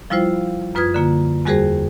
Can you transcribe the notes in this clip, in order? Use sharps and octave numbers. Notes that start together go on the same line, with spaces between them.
F3 G3 E4 F4 C5 F5
F#2 F4 B4 D#6 F6 G#6
D3 A#3 F4
E2 G3 F#4 G#4 A#4 C5